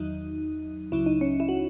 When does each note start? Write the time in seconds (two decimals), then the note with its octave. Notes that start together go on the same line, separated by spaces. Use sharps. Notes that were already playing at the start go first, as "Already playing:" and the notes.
Already playing: E2 D#3 F#3 D#4
0.92 C#2 C#3 F#3 E4
1.06 D#4
1.21 C#4
1.40 E4
1.49 F#4